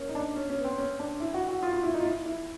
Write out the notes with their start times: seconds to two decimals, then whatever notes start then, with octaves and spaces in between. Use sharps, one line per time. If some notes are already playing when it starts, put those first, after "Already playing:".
Already playing: A#3 C#4
0.09 D#4
0.15 D4
0.36 C#4
0.50 C#4
0.58 B3
0.65 C4
0.78 C#4
0.99 D4
1.20 E4
1.34 F#4
1.49 F#4
1.63 F4
1.73 F4
1.83 E4
1.94 D#4
2.00 F4
2.05 E4
2.26 E4